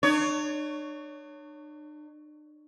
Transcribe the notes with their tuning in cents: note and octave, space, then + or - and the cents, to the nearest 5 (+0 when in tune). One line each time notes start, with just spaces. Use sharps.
D4 +45 C#5 +15